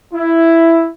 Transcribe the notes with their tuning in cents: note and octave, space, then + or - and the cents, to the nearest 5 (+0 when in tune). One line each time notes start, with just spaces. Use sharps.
E4 +5